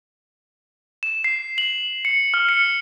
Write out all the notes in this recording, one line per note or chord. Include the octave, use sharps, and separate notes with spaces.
E7
C7
F#7
C#7
F6
C#7